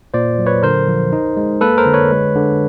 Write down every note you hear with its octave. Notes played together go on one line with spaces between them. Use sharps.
A#2 C5 D5
F#3
B4 C#5
D3 A#4 C5
F3
D#4
G#3
A#3 A4 B4
A#4 C5
D3
B4 C#5
G#3
D3